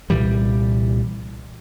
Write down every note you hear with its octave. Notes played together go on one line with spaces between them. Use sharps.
C2 A#2 E3 G3